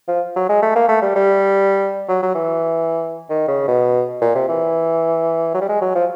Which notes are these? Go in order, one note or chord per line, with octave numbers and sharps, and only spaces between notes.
F3
F#3
G#3
A3
A#3
A3
G3
G3
F#3
F#3
E3
D#3
C#3
B2
A#2
C3
E3
F#3
G3
G#3
F#3
F3